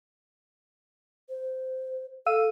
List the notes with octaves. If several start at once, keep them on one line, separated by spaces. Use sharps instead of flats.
C5
A4 F5 E6 D#7